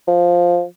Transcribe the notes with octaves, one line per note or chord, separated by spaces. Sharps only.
F3